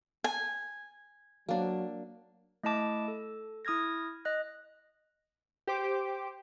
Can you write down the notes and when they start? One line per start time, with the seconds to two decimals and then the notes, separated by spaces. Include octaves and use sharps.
0.24 G#5
1.49 F#3 A#3 D4
2.63 A3 E4 D#5 E5 A5 D6
3.08 A4
3.65 E4 D#6 F6 G#6 A#6
4.25 D#5 F#6
5.67 G4 C5 D6